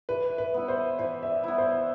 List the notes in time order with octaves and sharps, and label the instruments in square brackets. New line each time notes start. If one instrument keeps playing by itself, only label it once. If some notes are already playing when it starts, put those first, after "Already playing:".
[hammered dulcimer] E3 [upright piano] B4
[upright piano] B4
[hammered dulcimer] B3 E4
[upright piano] C5
[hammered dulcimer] E3 [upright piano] C5
[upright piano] E5
D5
[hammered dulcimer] B3 E4
[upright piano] C5